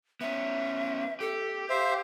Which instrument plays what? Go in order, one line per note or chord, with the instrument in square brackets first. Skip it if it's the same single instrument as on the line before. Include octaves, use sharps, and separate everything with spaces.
[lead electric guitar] B3 C#4 [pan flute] E5
[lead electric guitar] G4 [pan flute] A4
[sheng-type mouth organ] C5 E5 [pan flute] F5